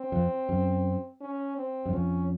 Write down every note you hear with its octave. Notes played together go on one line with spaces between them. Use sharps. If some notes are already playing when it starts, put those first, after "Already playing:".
Already playing: C4
F2
F#2
C#4
C4
F#2
F2 C#4